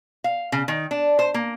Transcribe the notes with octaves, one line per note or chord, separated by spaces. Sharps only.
F5
C#3
D#3
D4
C5
A#3